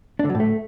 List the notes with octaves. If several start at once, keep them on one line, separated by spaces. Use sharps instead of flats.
D4
D3
F#3
A2
A3